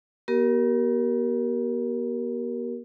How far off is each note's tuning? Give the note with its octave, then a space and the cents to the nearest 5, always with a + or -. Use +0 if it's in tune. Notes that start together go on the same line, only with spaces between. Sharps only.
B3 -45 G4 -35 A#4 +5